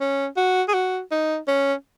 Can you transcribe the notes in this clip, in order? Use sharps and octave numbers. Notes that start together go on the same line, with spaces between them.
C#4
F#4
G#4
F#4
D#4
C#4